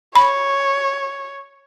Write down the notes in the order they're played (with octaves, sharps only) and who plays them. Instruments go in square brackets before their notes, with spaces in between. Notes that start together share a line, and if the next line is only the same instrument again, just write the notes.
[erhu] C#5 [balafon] B5